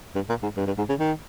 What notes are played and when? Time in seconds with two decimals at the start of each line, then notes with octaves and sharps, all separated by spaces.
0.15 G2
0.29 A#2
0.43 G#2
0.57 G2
0.67 G2
0.78 G#2
0.89 C#3
0.99 D#3